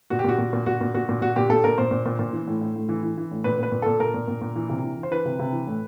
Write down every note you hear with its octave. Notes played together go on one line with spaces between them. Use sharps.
A#2 F#4
G4
A#2 F#4
A#2
A#2
A#2 F#4
A#2
A#2 F#4
A#2
A#2 F#4
A#2 G4
A#2 A4
A#2 A#4
A#2 C5
A#2
A#2
A#2
E3
A2
A2
A2
E3
E3
E3
A2
A#2 B4
A#2 B4
A#2
A#2 A4
A#2 A#4
A#2
A#2
A#2
E3
C3
E3
E3
C5
E3 B4
C3
C3
E3
A2